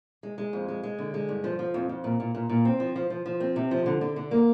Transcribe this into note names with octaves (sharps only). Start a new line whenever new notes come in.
G#3
G#3
F2
G#3
G#3
D3
G#3
G2
F3
F3
F2
F2
A#2
A#2
A#2
A#2
C4
F3
F3
F3
F3
C4
C3
F3
D3
D3
D3
A#3